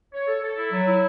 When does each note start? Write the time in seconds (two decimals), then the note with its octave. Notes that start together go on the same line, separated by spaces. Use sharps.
0.13 C#5
0.27 A4
0.43 A4
0.57 E4
0.72 F#3
0.87 E4